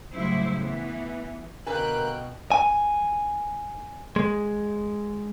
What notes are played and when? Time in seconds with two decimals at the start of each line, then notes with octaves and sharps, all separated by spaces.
0.13 A2 C#3 F#3 G3 E4 C5
0.59 E3 B3
1.67 B2 D3 A#4 B4 F5 G5 G#5 F#6
2.52 G#5
4.16 G#3